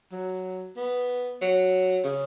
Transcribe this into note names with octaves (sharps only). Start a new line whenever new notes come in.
F#3
B3
F#3
C#3